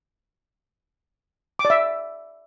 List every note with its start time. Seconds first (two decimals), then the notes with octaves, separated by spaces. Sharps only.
1.59 D6
1.65 D5
1.70 E5